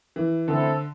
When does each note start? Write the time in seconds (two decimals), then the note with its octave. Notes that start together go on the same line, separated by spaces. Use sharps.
0.16 E3
0.48 D3 A3 C4 E4 A4